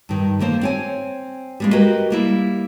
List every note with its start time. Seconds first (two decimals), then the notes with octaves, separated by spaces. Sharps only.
0.09 G2 D#3
0.40 D3 A#3 C5
0.61 C4 C#5 G#5
1.60 G3 G#3 A#3
1.73 F#4 G4 A#4 B4 D#5
2.10 G3 A#3 E4